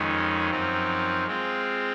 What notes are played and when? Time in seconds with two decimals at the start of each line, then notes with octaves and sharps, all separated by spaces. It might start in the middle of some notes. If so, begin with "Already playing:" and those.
Already playing: F2 D#3 G#3 C#4
0.50 F#2 F3 C4 D#4
1.27 G#3 C4 F4